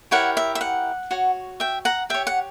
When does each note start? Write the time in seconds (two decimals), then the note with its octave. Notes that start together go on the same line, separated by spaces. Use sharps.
0.11 E4 G4 A#4 C#5 F#5
0.37 E5
0.55 E5
0.61 F#5
1.11 F#4 C#5
1.60 E5 G5
1.85 F#5 A#5
2.10 G4 C#5 E5 G5
2.27 F#5